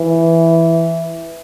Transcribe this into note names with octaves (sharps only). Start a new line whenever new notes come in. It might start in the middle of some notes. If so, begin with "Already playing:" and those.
Already playing: E3